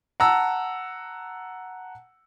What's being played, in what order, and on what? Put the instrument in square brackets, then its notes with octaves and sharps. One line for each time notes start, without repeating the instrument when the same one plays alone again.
[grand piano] F#5 A5 A#5 E6